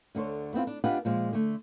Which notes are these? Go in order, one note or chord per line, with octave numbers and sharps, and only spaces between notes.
D2 D3 A4 C5 C#5
B3 C4 E4 F4
D4
D4 F4 G4 B4 D#5 F#5
A#2 F3 G#3
D3 A3